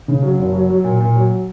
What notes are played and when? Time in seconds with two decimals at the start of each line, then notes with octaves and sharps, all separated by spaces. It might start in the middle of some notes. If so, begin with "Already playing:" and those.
0.08 C#3
0.23 F#3
0.39 F#1
0.53 F#3
0.70 F#3
0.84 A#2
1.00 A#2
1.16 F#3